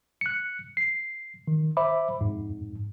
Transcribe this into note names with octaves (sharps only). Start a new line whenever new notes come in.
F#6 C#7
C7
D#3
C5 E5 B5 D6
F2 G#2